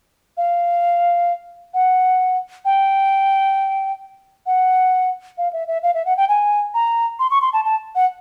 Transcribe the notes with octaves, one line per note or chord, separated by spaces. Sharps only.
F5
F#5
G5
F#5
F5
E5
E5
F5
E5
F#5
G5
G#5
A#5
C6
C#6
C6
A5
A5
F#5